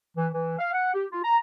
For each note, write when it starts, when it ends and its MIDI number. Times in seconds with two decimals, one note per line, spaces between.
0.16 0.27 52
0.33 0.55 52
0.59 0.71 77
0.73 0.91 78
0.94 1.05 67
1.12 1.22 65
1.23 1.37 82